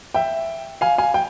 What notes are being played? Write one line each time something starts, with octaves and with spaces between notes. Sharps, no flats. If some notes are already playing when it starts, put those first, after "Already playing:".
E5 G5
F5 G#5
F5 G#5
G5